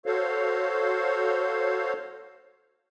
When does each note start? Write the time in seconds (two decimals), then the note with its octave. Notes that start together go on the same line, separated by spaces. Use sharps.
0.06 F#4 A4 C5 C#5 F5